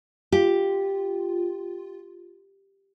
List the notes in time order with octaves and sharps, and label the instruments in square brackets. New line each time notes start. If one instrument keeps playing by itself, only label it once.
[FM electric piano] F4 [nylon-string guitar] G4